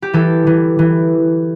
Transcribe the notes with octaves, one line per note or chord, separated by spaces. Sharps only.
G4
E3 A4
E3
E3